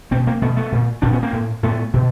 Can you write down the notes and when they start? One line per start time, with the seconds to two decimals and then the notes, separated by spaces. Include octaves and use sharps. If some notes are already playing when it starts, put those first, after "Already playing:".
0.11 B2 A#3 C4
0.27 A#3 C4
0.42 B2 A3 B3
0.57 A3 B3
0.72 A#2
1.02 A#2 C4 D4
1.12 B3 C#4
1.23 A#3 C4
1.32 A2
1.63 A2 A3 B3
1.93 B2